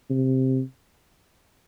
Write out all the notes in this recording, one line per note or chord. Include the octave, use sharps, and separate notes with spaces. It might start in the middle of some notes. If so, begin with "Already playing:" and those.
C3